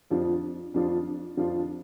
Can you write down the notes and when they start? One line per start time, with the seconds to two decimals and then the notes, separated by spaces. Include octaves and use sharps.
0.10 F2 F3 D4 F4
0.74 F2 F3 D4 F4
1.37 F2 F3 D4 F4